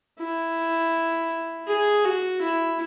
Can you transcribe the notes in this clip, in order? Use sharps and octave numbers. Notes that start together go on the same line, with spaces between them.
E4
G#4
F#4
E4